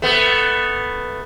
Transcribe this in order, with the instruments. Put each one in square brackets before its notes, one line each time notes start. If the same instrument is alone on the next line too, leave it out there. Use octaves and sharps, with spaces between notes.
[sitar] A3 B3